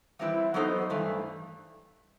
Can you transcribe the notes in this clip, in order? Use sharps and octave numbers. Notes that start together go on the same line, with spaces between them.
E3 G3 C4 E4 B4
F#3 B3 D#4 A4 C5
G2 E3 A3